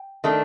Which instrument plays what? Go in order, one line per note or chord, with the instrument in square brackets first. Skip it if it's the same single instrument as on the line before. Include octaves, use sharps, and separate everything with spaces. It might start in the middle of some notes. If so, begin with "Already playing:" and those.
Already playing: [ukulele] G5
[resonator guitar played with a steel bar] D#3 A3 D4